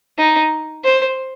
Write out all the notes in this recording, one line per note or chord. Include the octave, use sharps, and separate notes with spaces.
D#4
C5